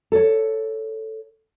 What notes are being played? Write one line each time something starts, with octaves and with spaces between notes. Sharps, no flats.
A4 C#5